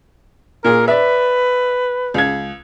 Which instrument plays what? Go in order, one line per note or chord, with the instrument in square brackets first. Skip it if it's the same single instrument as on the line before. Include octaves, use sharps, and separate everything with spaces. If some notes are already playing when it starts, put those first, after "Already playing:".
[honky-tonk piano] A#2 G#4 [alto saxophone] A#4
[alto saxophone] B4 [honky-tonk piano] D5 E5
[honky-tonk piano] C#2 G#6